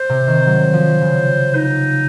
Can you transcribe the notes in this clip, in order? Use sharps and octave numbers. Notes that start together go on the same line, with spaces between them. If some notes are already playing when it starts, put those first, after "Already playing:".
Already playing: C5
C3
D#3
F#3
F3
C#3
D#4